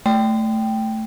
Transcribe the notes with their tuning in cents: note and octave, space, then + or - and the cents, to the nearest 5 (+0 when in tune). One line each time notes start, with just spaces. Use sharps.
A3 +0 G5 +0